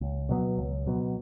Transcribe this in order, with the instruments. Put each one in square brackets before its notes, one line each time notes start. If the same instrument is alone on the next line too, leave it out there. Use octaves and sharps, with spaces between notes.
[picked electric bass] C#2
B2 F#3 B3
C#2
B2 F#3 B3